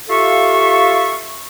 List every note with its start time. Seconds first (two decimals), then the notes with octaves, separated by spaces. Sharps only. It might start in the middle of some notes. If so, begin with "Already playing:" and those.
0.09 F4 G4 A4 E5 F5 C#6